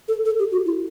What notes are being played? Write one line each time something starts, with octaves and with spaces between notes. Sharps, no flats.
A4
A4
G4
F#4
E4